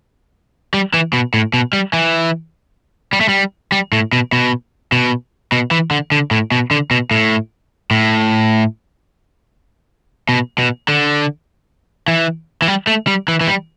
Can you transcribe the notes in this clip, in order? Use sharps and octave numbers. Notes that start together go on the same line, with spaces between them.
G3
E3
B2
A2
B2
G3
E3
G3
A3
G3
G3
A2
B2
B2
B2
B2
E3
D3
D3
A2
B2
D3
B2
A2
A2
B2
B2
D3
E3
E3
G3
A3
G3
E3
E3
G3